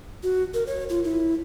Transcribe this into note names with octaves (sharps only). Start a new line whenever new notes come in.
F#4
A#4
C#5
F4
E4